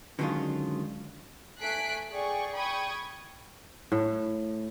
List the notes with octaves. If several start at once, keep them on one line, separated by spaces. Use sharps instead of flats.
D3 D#3 F#3 G#3 C#4 F4
A3 G#5 F#6 B6 C7 D7
G#4 D5 G5 C#6
G5 B5 C#6 D#6 G#6
A2